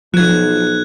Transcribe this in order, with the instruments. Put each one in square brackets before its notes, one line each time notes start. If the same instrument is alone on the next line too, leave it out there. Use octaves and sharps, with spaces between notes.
[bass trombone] B1 [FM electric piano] F3 [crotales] F#6 G#6